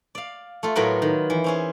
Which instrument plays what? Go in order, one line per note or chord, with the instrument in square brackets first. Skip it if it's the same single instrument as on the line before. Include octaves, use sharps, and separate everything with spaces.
[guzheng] D5 F5
A3 F4
A2 F#3 B3 F4 A#4 B4
D#3
E3
C4 C#4 G#4